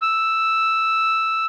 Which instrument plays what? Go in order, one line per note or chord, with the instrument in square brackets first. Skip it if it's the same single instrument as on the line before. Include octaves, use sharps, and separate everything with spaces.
[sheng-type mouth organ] E6